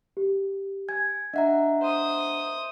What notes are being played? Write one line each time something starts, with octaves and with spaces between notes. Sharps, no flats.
G4
G#5 G#6
D4 D#5 E5 F#5 A#5
C5 D#6